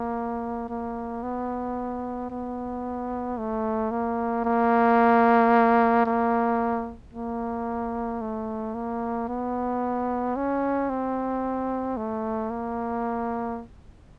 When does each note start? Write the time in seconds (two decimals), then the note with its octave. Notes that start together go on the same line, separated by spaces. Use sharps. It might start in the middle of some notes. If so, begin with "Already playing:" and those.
Already playing: A#3
0.69 A#3
1.23 B3
2.30 B3
3.38 A3
3.91 A#3
4.45 A#3
6.06 A#3
7.13 A#3
8.21 A3
8.74 A#3
9.28 B3
10.36 C#4
10.90 C4
11.97 A3
12.50 A#3